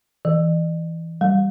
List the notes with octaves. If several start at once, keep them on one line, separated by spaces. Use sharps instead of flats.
E3
G3